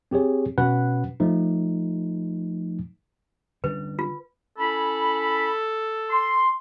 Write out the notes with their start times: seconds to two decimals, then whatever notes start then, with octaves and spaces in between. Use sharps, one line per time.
0.11 C4 G4 G#4 C#5
0.58 B2 C#4 F#4 B4 F#5 F#6
1.20 F3 A3 D#4
3.64 D3 G3 C#4 B4
3.99 F4
4.58 C#4 E4 A4 B5
6.10 C6